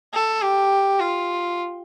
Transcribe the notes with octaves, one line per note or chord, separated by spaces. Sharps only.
A4
G4
F4